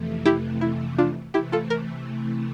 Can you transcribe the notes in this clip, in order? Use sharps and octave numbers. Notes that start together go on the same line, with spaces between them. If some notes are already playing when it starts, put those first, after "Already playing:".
Already playing: F2 C3 E3 A3
E4 G4
E4
D4 F4
C3 E3 A3 E4 G4
F4 A4
A#4